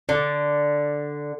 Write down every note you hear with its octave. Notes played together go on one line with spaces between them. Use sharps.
D3 D5